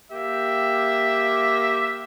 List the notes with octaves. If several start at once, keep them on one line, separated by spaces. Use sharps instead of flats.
A#3 G4 E5